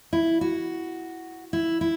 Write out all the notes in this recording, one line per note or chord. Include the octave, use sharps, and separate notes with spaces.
E4
F#4
E4
E4